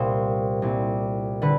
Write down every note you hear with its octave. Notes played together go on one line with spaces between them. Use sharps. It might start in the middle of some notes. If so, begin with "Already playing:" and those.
Already playing: C2 A#2 C5
C2 A#2
D3 B4